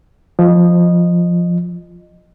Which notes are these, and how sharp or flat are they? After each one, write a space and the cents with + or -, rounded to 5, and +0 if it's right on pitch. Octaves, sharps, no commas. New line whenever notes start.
F3 +0 D#5 -15